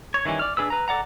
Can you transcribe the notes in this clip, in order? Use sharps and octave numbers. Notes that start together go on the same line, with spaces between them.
C#5
D#3 E3 G3 C#4
D5 F6
D4 G#4 B4 E6
B4 A#5
A4 D5 F#5 A#5